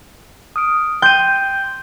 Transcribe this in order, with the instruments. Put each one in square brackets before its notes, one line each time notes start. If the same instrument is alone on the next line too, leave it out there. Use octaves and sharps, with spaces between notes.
[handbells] D#6 F6 D7
[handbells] G5 C6 [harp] G6 D#7